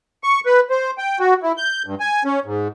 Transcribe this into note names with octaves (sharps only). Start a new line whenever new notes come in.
C#6
B4
C5
G5
F#4
E4
G6
G2
G#5
C#4
G#2